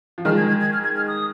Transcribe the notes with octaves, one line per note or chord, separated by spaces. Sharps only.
F3
D#3 G#3 F6
G#6
G#6
G#6
F6
G#6
F6
D#6